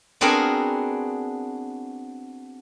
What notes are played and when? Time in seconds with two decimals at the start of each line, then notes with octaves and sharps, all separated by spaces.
0.21 B3 C4 D4 F#4 G#4 A#4